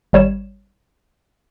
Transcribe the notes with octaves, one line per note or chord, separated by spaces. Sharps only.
G#1 G3 C#5 E7